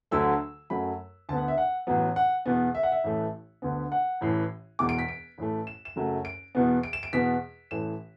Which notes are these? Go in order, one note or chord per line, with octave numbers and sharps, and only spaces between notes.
D2 D3 F#3 A3 E6
F#2 F#3 A3 B5
D2 D3 B3 A5
F#5
E5
F#5
A1 A2 F#3 B3
F#5
E2 B2 B3
E5
F#5
E5
A1 A2 E3 A3
D2 D3 B3
F#5
A1 A2 E3
E1 E2 B2 D6
D7
B6
D7
A1 A2 E3 A3
E7
E7
F#1 F#2 F#3 A3
D7
E2 B2 B3
D7
E7
D7
E2 B2 B3 B6
A1 A2 E3 A3 E7